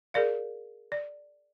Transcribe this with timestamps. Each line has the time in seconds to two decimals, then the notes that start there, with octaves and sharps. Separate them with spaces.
0.14 G#4 A#4 D5 F5
0.92 D5